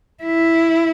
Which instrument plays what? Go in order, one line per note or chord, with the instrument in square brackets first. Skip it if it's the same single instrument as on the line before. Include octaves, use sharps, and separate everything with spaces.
[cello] E4